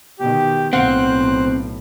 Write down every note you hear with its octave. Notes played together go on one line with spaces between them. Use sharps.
B2 D#3 G4
B1 A2 C4 C5 F5 F#5 F#6